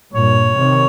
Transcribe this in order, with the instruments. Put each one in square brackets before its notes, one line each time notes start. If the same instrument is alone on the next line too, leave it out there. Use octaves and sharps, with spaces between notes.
[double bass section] G2 A#2 [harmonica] C#5
[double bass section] C3 D#3